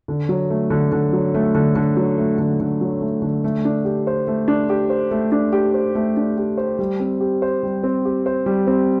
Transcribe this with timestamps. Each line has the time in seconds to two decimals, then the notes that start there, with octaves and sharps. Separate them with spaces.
0.08 D3
0.29 F#3
0.50 A3
0.70 D3
0.92 D3
1.13 F#3
1.34 A3
1.55 D3
1.75 D3
1.97 F#3
2.18 A3
2.38 D3
2.60 D3
2.81 F#3
3.01 A3
3.22 D3
3.44 A3
3.65 D4
3.85 G4
4.07 C5
4.27 A3
4.48 D4
4.70 G4
4.90 C5
5.11 A3
5.32 D4
5.53 G4
5.74 C5
5.95 A3
6.17 D4
6.37 G4
6.58 C5
6.79 G3
7.00 C4
7.20 G4
7.42 C5
7.63 G3
7.83 C4
8.05 G4
8.26 C5
8.46 G3
8.67 C4